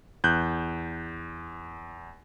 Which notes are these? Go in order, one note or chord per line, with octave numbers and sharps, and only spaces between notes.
E2 F#6 G6